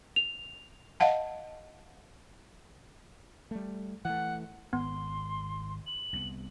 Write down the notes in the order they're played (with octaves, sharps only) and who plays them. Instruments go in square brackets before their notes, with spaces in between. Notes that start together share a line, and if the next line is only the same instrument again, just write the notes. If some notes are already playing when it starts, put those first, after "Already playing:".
[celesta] F7
[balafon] D#5 F5 F#5 A5
[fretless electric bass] G3 A3
[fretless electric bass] E3 A3 [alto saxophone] F#5
[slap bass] G#1 [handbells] B3 [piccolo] C6
[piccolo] F#7
[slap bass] C2 B3